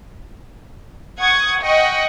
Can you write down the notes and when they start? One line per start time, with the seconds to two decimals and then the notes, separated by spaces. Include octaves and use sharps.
1.20 F#5 C#6 D#6 G#6
1.63 D#5 F#5 G5 C#6